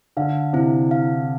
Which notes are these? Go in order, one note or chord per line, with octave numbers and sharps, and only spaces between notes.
D3 F5
C3 E4
F5